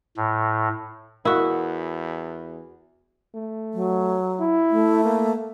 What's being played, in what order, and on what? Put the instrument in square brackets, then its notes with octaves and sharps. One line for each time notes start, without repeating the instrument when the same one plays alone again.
[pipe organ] A2
[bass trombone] E2 [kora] E4 F#4 [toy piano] A#4 F5
[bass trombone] A3
[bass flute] F#3
[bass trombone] E4
[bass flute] A3
[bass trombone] A#3